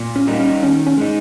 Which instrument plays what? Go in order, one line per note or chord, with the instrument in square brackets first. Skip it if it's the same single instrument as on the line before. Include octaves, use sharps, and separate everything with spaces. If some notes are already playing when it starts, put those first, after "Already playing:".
Already playing: [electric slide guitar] A#2
[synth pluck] C#4
[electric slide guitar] G3 A#3 D#4
[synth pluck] C#4
[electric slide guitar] D#3 [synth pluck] C#4
[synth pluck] C#4
[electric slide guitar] G#3 D#4